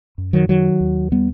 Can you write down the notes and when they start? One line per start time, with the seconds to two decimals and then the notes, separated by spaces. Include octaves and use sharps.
0.18 F#2
0.33 D#3 F#3
0.49 D#3 F#3
0.80 D#2
1.12 G3 B3